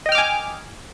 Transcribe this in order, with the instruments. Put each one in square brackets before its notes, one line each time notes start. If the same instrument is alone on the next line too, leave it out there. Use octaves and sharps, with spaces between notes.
[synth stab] D#5
G5
F6
D6
G#5